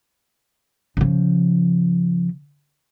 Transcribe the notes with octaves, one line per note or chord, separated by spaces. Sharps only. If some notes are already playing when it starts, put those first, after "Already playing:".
C#3 F3